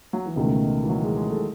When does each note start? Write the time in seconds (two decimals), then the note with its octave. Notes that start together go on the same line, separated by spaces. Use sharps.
0.13 F#3
0.26 E3
0.36 C#2 B2 D#3 A3
0.84 E3
0.89 F#3
1.03 G#3
1.16 G#3
1.30 A3